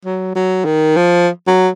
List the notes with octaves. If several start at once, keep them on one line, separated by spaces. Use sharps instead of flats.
F#3
F#3
D#3
F3
F#3